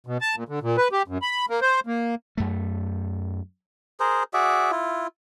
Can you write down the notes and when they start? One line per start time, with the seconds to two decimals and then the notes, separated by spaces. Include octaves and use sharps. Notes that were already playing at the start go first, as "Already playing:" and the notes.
0.07 B2
0.21 A5
0.36 A#2
0.49 D3
0.63 A#2
0.77 B4
0.92 G4
1.08 F#2
1.22 B5
1.50 A#3
1.62 C5
1.87 A#3
2.37 F#2 A3
4.00 G#4 A#4 C5
4.34 F#4 G#4 D5 E5
4.71 E4 F4